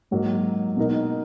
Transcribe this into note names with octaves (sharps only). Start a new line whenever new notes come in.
G#2 F#3 A#3
B2 A#3 D#4 A#4